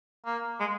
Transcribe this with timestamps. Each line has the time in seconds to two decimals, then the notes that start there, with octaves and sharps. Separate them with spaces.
0.26 A#3
0.60 G#3